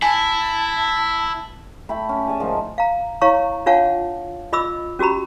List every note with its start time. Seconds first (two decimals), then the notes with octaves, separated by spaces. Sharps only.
0.02 E4 G#5 A5
1.89 A3 E4 G5 B5
2.09 C#4 G4
2.27 G#4 D5 G#5 A5
2.40 G#2 D#3 F3 A3
2.78 F5 A#5
3.21 E4 C#5 F5 A#5 C#6
3.66 D4 F4 C#5 F5 F#5 A5
4.53 F4 D#5 B5 D6 E6
4.99 C#4 F#4 G4 A#5 B5